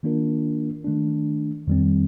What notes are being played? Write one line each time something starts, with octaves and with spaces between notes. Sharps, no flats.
D#3 A#3 D4 F4 A#4
D#3 A3 D4
F2 D#3 G3 C4